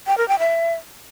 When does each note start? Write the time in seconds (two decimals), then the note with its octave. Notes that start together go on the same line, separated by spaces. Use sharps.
0.07 G5
0.17 A#4
0.28 G5
0.39 E5